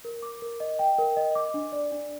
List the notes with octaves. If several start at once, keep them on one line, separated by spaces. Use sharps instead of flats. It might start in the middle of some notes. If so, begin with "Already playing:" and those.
A#4
D6
A#4
D#5
G5
A#4
D#5
D6
D4
D5
D4